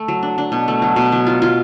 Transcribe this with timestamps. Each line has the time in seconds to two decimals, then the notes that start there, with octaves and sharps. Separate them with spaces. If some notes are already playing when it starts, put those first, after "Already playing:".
Already playing: A3
0.08 F#3
0.23 D4
0.38 D4
0.52 B2
0.68 A3
0.82 F#3
0.96 B2
1.12 F#3
1.27 F4
1.42 F4